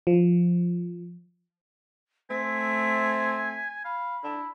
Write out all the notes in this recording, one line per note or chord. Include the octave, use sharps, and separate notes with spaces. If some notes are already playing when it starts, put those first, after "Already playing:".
F3
A3 C4 G#5 B6
F5 B5
D4 E4